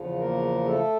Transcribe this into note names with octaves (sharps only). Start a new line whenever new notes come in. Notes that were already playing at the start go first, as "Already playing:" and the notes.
Already playing: E2 C#3 F3
A#3 A#4
A3 A4